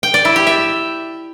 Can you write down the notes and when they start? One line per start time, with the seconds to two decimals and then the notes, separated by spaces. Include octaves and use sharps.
0.03 G5
0.14 D5
0.25 E4
0.36 G4
0.47 E5